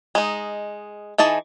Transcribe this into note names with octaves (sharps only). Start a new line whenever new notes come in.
G#3 D#4
E3 D#4 G#4 A5